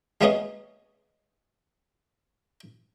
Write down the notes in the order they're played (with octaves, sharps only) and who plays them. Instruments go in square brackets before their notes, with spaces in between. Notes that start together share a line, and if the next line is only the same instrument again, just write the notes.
[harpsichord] G#3 A#3 B3 C#4 G#4 D#5